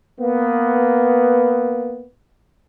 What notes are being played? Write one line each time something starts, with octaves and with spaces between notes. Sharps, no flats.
A#3 B3